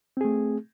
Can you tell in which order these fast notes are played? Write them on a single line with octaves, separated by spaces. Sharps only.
C4 G#4 A3